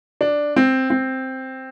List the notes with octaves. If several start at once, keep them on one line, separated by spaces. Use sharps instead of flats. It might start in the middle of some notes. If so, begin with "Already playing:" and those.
D4
C4
C4